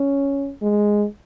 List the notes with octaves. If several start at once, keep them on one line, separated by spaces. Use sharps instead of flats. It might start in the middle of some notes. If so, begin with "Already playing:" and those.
Already playing: C#4
G#3